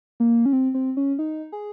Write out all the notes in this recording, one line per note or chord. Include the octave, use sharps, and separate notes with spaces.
A#3
C#4
C4
C4
C#4
D#4
G#4